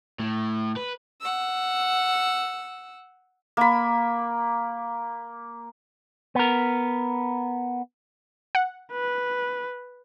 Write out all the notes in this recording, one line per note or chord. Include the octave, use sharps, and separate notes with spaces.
A2
B4
F#5 E6
A#3 B5
B3 A#4
F#5
B4